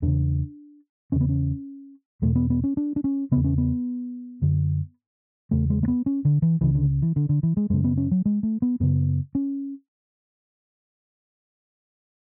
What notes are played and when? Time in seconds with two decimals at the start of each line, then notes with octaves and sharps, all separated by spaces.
0.02 E2 C#3 D4
1.12 E2 C#3 C#4
1.21 B3
1.29 C#4
2.22 E2 B2 A3
2.35 B3
2.50 B3
2.64 C#4
2.77 D4
2.96 D4
3.04 C#4
3.32 E2 C#3 B3
3.44 C#4
3.58 B3
4.42 F#2 D3
5.51 E2 C#3 A3
5.70 G#3
5.83 A3
5.88 B3
6.06 C#4
6.25 D3
6.42 E3
6.61 C#2 C#3 E3
6.75 D3
7.02 E3
7.16 D3
7.29 D3
7.43 E3
7.57 G#3
7.70 F#2 C#3 G#3
7.84 B3
7.97 C#4
8.11 F#3
8.25 G#3
8.43 A3
8.62 B3
8.80 F#2 C#3 B3
9.35 C#4